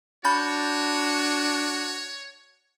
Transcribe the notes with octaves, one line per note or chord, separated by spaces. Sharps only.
D4 F#4 C#5 B5 G6 A6